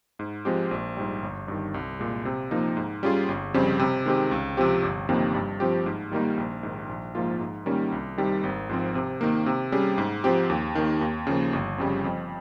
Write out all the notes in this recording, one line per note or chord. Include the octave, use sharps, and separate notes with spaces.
G#2
F3 G#3 C4 G4
A#1
G#2 G3
G1
G2 D#3
C2
A#2 G#3
C3
F3 A#3 D#4
G#2
G3 C#4 F4 G#4
G1
F2 C#3 G3 C4
C3
D#3 G#3 C4 G4
C#2
C3 F3 C4 G4
G1
F2 C3 D#3 A#3
G2
F3 C4 G4
G#2
D#3 G3 A#3 D#4
A#1
G#2 D#3
A#1
G#2 F3 A#3 F4
G#2
D#3 G3 A#3 C#4
C2
C3 D#3 G3
G#1
G#2 F3 C4
C3
D#3 A#3
C3
G3 C#4 G#4
G#2
F3 C4 G4
D#2
D#3 A#3
D#2
C#3 F3 A#3
G1
F2 C#3 G3
F2